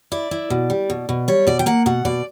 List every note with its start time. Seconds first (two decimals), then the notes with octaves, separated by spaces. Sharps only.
0.12 E4 D5
0.31 E4
0.50 B2
0.70 G3
0.90 B2
1.09 B2
1.28 G3 C#5
1.47 B2 D5
1.59 G5
1.66 A#3 F#5
1.86 B2 F#5
2.05 B2 D5